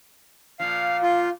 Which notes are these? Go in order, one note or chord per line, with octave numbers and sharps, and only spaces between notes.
A#2 F3 F5
F4